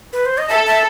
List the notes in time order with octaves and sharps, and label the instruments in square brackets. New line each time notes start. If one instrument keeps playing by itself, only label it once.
[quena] B4
C5
D#5
[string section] A4 [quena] E5
[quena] E5